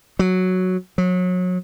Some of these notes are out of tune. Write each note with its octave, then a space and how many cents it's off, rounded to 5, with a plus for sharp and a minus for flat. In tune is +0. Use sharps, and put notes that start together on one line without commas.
F#3 -5
F#3 -30